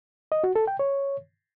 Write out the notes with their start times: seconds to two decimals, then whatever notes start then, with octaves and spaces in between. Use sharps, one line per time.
0.32 D#5
0.44 F#4
0.56 A4
0.67 G5
0.79 C#5